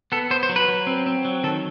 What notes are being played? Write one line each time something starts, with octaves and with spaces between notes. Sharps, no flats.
B3 A4
B3 C5
C5
F#3
B4
F#3
C4
C4
F#3
D#3 A4